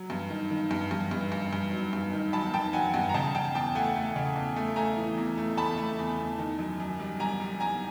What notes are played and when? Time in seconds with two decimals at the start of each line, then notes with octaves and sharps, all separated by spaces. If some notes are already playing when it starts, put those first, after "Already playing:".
Already playing: F#3
0.10 G2
0.30 D#3
0.50 D#3
0.71 G2
0.91 G2
1.11 G2
1.32 G2
1.53 G2
1.72 F#3
1.93 G2
2.13 D#3
2.33 F#3 A5 B5
2.53 D#3 G5 A5
2.73 F#3 F#5 G#5
2.93 G2 F#5 G#5
3.09 A#5
3.14 C#3 G5 A5
3.35 C#3 G5 A5
3.55 E2 G5 A5
3.75 A3 F#5 G#5
3.96 A3
4.16 C#3
4.35 E2
4.56 A3
4.76 A3 G#5 A#5
4.97 E3
5.17 E2
5.38 A3
5.57 A3 A5 B5
5.78 A3
5.99 E2
6.18 E2
6.38 D#3
6.59 F#2
6.80 F#2
6.99 G3
7.20 G3 G#5 A#5
7.40 G3
7.60 G3 G#5 A#5